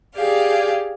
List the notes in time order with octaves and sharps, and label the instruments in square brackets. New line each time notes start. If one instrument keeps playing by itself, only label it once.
[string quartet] G4 G#4 D5 F5